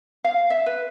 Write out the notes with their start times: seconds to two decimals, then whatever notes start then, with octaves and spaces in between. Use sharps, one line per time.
0.24 F5
0.50 E5
0.66 B4